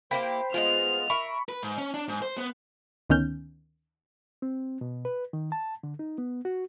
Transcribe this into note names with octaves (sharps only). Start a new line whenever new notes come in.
A#3 E4 G4 C5 G5 B5 B6
G#3 A#3 B3 F4 D#5 F6
A#4 E5 B5 C#6
B4
G#2
C#4
D4
G#2
C5
B3
D2 D#3 B3 C#4 F6 G6
C4
B2
B4
D#3
A5
D3
D#4
B3
F#4